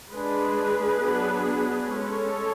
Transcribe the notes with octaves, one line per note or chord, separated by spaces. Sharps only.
G#3 D4 G#4 B4
F#3 B3 D4
G#3 C#4 A4 C#5